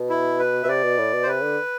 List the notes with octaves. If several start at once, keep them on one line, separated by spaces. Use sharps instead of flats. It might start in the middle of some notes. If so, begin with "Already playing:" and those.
Already playing: B2
E4
B4
B2 E5
C3 D5
B2
A2
B2
C5
C3 B4
D3